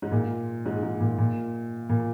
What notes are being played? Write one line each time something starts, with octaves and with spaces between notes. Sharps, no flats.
G#2
A#2
G#2
G#2
A#2
A#2
A#2